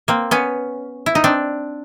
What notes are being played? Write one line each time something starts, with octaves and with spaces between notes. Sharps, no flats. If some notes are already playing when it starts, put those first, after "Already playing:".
A#3 C4
B3 C#4
E4
D#4
C4 D4